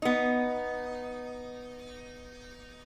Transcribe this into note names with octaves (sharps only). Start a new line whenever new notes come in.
B3 D#4